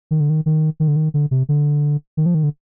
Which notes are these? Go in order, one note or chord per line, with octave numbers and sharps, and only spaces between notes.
D#3
D3
D#3
D#3
D#3
D3
D#3
D3
C3
D3
D#3
F3
D#3
D3